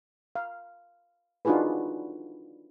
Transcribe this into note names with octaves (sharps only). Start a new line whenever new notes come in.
F5
D4 D#4 F4 F#4 G#4 B4